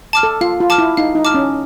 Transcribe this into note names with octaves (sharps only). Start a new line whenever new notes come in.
A5 D6 F6
A4
F4 F5
F4
A5 D6 F6
E4
D#4 F5
D#4
A5 D6 F6
C#4